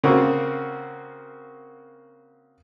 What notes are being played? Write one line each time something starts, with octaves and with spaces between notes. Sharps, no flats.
C#3 A#3 C4 F#4